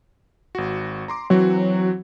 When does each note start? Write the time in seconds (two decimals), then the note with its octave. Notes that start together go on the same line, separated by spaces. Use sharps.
0.55 G#1 F#4
1.08 A#5 C6 D6
1.30 E3 F#3 C4 F#4